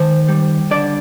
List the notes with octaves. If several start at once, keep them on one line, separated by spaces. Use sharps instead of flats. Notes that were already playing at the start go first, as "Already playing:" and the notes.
Already playing: D#3 C5
G3
D3 D5